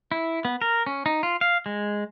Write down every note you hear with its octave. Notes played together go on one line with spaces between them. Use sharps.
E4
B3
A#4
C#4
D#4
F4
F5
G#3